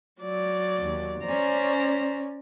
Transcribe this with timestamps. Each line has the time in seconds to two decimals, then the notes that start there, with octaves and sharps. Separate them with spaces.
0.21 F#3 D5
0.81 D#2
1.24 C#4 C5 D5 A#5